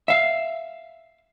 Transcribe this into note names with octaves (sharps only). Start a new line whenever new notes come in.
E5 F5